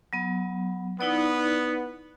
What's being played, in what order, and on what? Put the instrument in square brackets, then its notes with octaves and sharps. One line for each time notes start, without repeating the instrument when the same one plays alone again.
[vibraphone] F#3 B3
[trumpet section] B3 [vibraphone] D#4 E4 D5